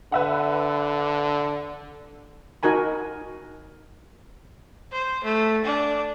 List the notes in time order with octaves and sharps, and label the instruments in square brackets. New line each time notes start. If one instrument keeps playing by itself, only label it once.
[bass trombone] D3 [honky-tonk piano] B4 E5 F#5
[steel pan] D#4 F#4 A#4 G#5 B5
[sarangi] C5
A3
D4